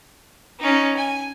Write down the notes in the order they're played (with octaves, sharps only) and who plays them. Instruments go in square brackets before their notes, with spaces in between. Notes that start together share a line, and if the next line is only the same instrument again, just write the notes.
[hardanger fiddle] C#4 D#4
G#5